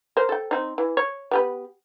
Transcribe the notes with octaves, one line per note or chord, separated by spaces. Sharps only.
A#4 C5
A4 G5
C4 D#4
E3
C#5
B3 G4 B4